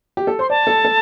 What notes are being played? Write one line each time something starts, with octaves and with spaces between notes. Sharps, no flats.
G4
A4
C5 C6
D5 A5
A4
A4